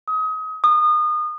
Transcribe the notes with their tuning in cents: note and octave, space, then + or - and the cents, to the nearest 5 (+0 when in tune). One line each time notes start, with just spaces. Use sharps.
D#6 +30
D#6 -30